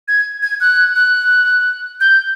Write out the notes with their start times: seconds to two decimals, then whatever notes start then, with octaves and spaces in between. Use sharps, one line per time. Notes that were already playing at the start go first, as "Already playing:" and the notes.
0.08 G#6
0.42 G#6
0.61 F#6
0.96 F#6
2.00 G6